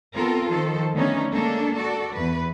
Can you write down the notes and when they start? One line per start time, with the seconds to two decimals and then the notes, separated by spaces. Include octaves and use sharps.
0.16 B3 C4 F4 A4 A#4
0.50 D#3 F3 A4 C5
0.94 D3 A3 B3 C#4 D#4
1.33 G#3 A#3 C#4 D4 A4
1.76 F#4 A4 D5
2.14 E2 B4